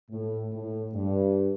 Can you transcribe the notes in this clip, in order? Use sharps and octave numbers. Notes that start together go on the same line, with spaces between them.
A2
A2
G2